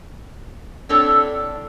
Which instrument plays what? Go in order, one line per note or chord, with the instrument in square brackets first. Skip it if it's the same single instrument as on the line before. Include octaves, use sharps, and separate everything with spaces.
[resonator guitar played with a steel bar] A2 C4 D4 A4 C#5